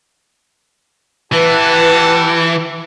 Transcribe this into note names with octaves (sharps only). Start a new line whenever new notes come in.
E3 G4 B4 F#5 A5